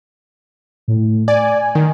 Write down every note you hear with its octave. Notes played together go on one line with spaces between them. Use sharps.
A2
D5 G#5
D#3